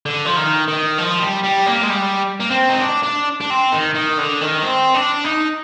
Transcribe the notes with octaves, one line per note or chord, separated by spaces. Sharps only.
D3
F3
D#3
D#3
F3
G3
G3
A#3
G#3
G3
A#3
C4
D#4
D4
D4
D4
C4
D#3
D#3
D3
D#3
C4
D4
D#4